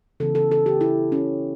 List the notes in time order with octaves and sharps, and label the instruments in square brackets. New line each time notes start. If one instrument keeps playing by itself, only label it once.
[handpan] C#3 E3 B3 A4
A4
A4
G4
E4
C#4